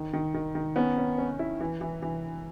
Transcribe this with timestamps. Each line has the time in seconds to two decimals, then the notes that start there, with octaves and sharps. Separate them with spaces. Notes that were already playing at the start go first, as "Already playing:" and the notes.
Already playing: D#3
0.13 D#3
0.34 D#3
0.55 D#3
0.76 B3 C#4
0.98 C#4
1.18 C#4
1.39 E4
1.60 E3
1.81 E3
2.02 E3